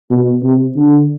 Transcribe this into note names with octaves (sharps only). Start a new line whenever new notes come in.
B2
C3
D3